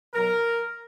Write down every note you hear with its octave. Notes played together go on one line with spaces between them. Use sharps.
B2 F#3 A#4